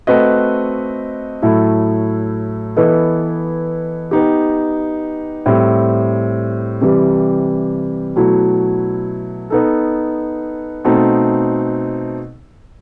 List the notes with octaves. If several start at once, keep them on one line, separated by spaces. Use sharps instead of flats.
A3 C4 F#4 B4 D#5
A2 F#3 A3 E4
E3 B3 E4 A4 D#5
B3 D#4 G4
A2 G3 C4
C3 E3 G3
B2 F#3 A3 E4
B3 D#4 A4
B2 A3 C4 D#4